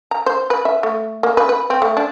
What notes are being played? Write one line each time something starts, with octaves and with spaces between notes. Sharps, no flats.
A#5
C5
B4
E5
A3
A#3
B4
B4
C4
A3
D4